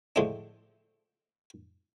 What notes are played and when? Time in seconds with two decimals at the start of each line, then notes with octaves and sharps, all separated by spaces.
0.16 A2 D3 F3 G#3 A3 D4